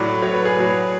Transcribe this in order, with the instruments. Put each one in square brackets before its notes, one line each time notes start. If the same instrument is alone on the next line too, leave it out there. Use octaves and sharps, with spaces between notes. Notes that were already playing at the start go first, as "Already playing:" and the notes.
Already playing: [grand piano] A2 F#3 D5
A2 F#3 C#5
B4
G#4
A2 F#3